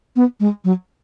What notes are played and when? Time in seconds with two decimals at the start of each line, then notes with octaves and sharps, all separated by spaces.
0.16 B3
0.40 G#3
0.65 F#3